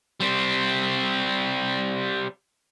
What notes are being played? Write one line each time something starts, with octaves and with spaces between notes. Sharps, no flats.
G3 C4